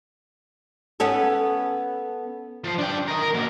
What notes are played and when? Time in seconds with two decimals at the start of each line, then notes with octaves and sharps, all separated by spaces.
1.00 B3 C#4 A4
2.64 F3 C5
2.78 D4 G5
3.08 A#4 D#5
3.21 A#4
3.34 F#3 A#3